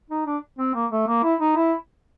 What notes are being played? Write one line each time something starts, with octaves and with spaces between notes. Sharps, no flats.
D#4
D4
C4
A#3
A3
A#3
E4
D#4
E4